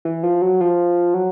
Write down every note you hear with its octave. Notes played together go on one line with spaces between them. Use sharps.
E3
F3
F#3
F3
F#3